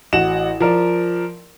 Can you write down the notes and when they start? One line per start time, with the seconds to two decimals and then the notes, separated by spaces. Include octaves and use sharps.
0.13 A1 F#4 F#5 E7
0.60 F3 A#4 D5